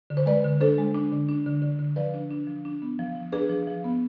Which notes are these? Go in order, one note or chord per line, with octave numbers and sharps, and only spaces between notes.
D3
C5
G#3 B4 D5
D3
D4 A4 C5
G#3
D4
D3
D4
D3
D3
D3
F3 B4 D5
D4
D4
F3
D4
B3
F3
F3
D4 G#4 B4
F3
F3
B3